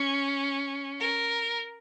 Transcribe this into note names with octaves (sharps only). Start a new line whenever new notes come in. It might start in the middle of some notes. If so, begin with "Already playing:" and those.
Already playing: C#4
A#4